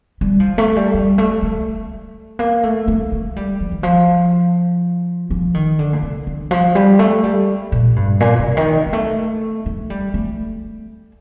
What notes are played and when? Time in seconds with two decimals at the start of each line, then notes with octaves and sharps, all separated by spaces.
0.21 G3
0.40 F3
0.58 A3
0.76 G3
0.94 G3
1.18 A3
1.42 A3
2.39 A#3
2.63 A3
2.88 A3
3.12 A3
3.36 G3
3.60 F3
3.72 D#3
3.83 F3
5.30 F3
5.54 D#3
5.79 D3
5.93 A#2
6.02 C3
6.27 D3
6.51 F3
6.75 G3
6.99 A3
7.24 G3
7.72 A#2
7.96 G2
8.20 A#2
8.39 C3
8.57 D#3
8.86 G3
8.93 A3
9.66 A3
9.90 G3
10.14 A3